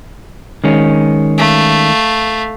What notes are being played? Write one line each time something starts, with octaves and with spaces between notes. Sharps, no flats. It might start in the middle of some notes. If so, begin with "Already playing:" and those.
D#3 G#3 C#4
A3 F5